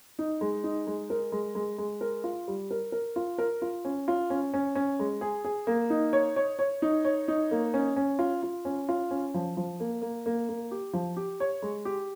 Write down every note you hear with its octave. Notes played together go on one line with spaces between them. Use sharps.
D#4
G#3
D#4
G#3
A#4
G#3
G#3
G#3
A#4
F4
G3
A#4
A#4
F4
A#4
F4
C#4
F4
C#4
C#4
C#4
G#3
G#4
G#4
A#3
D#4
C#5
C#5
C#5
D#4
C#5
D#4
A#3
C#4
C#4
F4
F4
C#4
F4
C#4
F3
F3
A#3
A#3
A#3
A#3
G4
F3
G4
C#5
G#3
G4